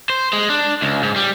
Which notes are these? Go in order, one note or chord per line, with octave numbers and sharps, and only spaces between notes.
C5
G#3
D4
C#2
G#2
G3